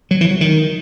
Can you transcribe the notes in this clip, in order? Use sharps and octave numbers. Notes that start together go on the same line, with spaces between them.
F#3
E3
F#3
D#3